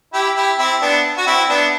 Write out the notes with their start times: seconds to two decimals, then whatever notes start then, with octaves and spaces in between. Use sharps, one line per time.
0.13 E4 G4
0.36 E4 G4
0.58 C4 E4
0.82 B3 D4
1.17 F#4
1.26 C4 E4
1.49 B3 D4